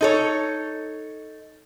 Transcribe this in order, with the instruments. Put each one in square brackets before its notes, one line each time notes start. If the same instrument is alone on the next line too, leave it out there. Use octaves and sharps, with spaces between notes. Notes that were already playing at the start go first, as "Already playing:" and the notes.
[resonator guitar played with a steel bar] D#4 A4 C#5